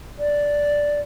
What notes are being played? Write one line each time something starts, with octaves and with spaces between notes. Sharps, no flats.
D5